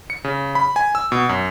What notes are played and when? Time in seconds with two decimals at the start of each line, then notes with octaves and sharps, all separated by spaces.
0.10 C#7
0.24 C#3
0.55 B5
0.76 G#5
0.95 E6
1.12 B2
1.29 F#2